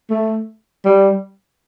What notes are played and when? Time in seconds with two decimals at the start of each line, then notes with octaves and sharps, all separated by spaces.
0.10 A3
0.85 G3